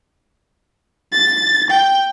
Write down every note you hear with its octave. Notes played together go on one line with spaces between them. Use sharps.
A6
G5